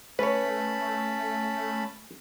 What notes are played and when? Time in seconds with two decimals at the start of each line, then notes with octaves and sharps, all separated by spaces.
0.19 A3 C#4 B4 C#5 A5 B5